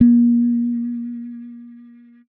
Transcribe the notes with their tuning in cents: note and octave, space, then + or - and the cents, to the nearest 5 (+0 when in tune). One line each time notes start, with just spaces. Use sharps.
A#3 +35